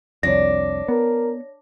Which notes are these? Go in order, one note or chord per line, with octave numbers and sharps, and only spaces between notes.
C2 F2 D4 C#5 A#6
B3 A#4